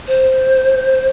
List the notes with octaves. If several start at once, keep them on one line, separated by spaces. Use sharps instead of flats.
C5